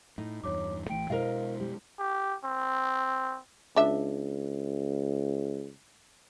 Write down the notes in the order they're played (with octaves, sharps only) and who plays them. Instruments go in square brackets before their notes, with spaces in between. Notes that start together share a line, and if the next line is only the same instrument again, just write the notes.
[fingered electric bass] A2 [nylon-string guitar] D#4
[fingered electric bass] E2 G2 [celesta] C#5 D6
[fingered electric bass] A1 E3 A3 [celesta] G5 D7
[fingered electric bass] B2 G#3 [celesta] E4 C5 [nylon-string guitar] A#4 D#5 F5
[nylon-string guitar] G3
[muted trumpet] G4
C4
[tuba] C#2 [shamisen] D4 E5